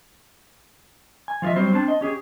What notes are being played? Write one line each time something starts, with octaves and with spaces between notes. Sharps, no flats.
G#5
F3 F4 G#4 D#5 E5
F#3 G3 C4 C5
C4 D4 A5
D#5
C#4 G4 G#4